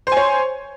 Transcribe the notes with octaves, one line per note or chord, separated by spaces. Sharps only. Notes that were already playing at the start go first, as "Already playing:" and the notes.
C5 C#5 G#5